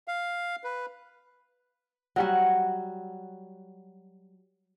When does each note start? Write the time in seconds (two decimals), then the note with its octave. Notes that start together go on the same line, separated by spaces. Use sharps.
0.08 F5
0.64 B4
2.16 F#3 G3 F#4